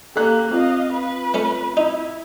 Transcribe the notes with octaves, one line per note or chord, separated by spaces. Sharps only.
A#3 G4 A4 F#6
C4 F4 D#5 F5
B4
A3 C#4
D#4 E4